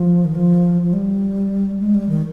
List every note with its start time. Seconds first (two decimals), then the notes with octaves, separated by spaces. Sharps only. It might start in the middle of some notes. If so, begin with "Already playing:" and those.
Already playing: F3
0.25 D#3
0.35 F3
0.82 F3
0.93 G3
1.80 G#3
1.95 G3
2.09 D#3